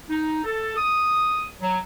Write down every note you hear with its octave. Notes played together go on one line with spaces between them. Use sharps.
D#4
A4
D#6
F#3